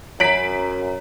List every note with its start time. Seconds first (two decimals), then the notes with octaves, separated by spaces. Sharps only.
0.20 F#2 C#5 A#5 B6 D7 F#7